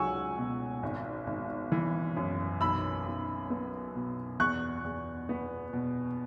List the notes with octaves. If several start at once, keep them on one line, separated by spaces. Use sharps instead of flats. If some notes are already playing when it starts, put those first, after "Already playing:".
Already playing: C#2 F#3 F#5 G#5 C#6 E6
B2
G#1
G#1
E3
F#2
B1 B5 E6
B1
B3
B2
E2 C#6 F#6
E2
B3
B2